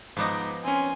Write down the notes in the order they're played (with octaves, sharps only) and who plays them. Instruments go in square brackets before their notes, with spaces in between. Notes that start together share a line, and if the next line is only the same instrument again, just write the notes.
[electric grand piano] G#2 D6 [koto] F3 B3 D#4
[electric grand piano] C4 C#4 [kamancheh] G#5 C6